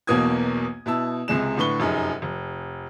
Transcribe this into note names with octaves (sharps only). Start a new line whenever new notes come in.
B1 E2 B2 A#3 D#6 G#6
B2 E4 A5 E6
C#2 C3 G#3 E7
A2 D3 B4 C#6 G7
F1 F#2 D#4 G#4
F1